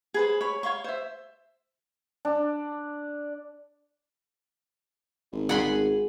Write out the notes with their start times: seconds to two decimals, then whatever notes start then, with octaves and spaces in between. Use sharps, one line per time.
0.14 G#4 B4 C5
0.41 C#5 B5
0.63 C#5 F5 C6 C#6
0.84 C5 E5
2.25 D4
5.32 G#1
5.49 G#4 D5 F#5 B5 C6